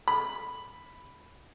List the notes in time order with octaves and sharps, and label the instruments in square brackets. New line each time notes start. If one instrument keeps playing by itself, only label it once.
[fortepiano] B5